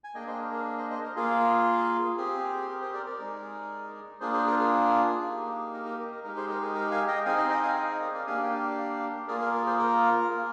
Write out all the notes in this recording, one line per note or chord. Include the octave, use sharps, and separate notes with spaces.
G#5
A#3 D4 G#4 D#5 G5
C5 D#5
A#4
A#4
C5 D#5
C5 D#5
A#4
A#3 F4 G#4
C4 G4 G#4
A#4
G#4 C5
A#4 D5
A#4 D5
G#3 D#4 G#4
A#3 D4 F4 G#4 C5
G#4 C5
A#4
G#4
A#3 D#4 G4
A#4
A#4
A#4
A#4
G#3 D#4 G4 A#4
G#4 C5
A#4
G#4
A#4
F5 G#5
D#5 G5
C4 D#4 G#4 F5 G#5
D#5 G5
D#5 G5
F5 G#5
D#5 G5
A#4 D5
D5 F5
A#3 D4 G4 F5 G#5
G5
D5 F5
A#3 F4 G#4 A#4 D5
A#4
A#4
G#4 C5
A#4
A#3 F4 G#4